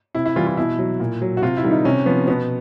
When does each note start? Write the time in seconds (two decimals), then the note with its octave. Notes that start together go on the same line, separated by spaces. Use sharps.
0.15 C3 E4
0.26 E4
0.36 E3 G3 F4
0.47 F4
0.57 B2 E4
0.79 F#3
1.00 A#2
1.22 F#3
1.37 F#4
1.42 C3 F4
1.57 E4
1.64 D#3 G3
1.71 D#4
1.85 C3 C#4
2.06 F3 B3
2.27 B2 B3